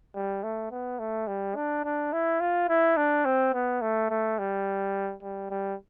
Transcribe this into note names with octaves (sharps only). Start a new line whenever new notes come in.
G3
A3
B3
A3
G3
D4
D4
E4
F4
E4
D4
C4
B3
A3
A3
G3
G3
G3